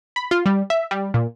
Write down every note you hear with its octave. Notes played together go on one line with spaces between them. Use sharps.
B5
F4
G3
E5
G3
A#2